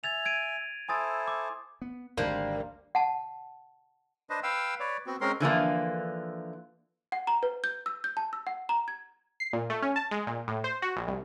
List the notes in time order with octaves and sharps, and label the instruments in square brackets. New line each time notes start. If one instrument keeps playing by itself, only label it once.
[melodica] E5 G#5 [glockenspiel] G#6 A6 F7
[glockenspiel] G#6 D7 D#7
[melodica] E4 A4 C5 [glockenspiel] G#5 D#6 A6
[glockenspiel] D6
[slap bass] B3
[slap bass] G#1 D2 [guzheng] G3 D4 C5 [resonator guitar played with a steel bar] A#3
[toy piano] F#5 A5
[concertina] D4 B4 C5 D#5
B4 F5 G5 E6
B4 C#5 D5
B3 C4 F#4
G#3 C4 C#4 A#4 C6
[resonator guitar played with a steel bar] D3 E3 F3 A#3
[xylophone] F#5
A#5
B4
G6
E6
G6
A5
E6
F#5
A#5
G#6
[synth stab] C7
A#2
A3
C#4
A5
G#3
A#2
A2
C5
F#4
A#1
C2